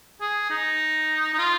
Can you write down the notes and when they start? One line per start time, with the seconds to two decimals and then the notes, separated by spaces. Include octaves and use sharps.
0.21 G#4
0.50 D#4
1.34 D#4
1.38 F4